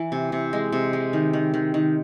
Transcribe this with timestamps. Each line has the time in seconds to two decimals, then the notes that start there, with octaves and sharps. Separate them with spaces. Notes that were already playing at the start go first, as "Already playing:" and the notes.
Already playing: E3
0.12 C3
0.32 C3
0.53 G#3
0.72 C3
0.93 G#3
1.13 D#3
1.33 D#3
1.54 D#3
1.74 D#3